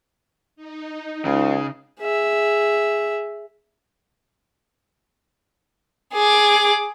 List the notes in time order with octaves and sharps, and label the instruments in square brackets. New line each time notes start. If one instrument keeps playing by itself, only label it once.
[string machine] D#4
[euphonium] C#2 [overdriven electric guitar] C#3
[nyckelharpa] G#4 E5
[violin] G#4 D6